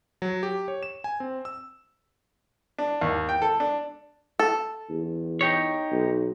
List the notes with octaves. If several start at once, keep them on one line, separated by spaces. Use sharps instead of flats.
F#3
G4
C#5
E7
G#5
C4
E6
D4
D#2
G5
A4
D4
A4
E2
D#4 G4 C#5
B1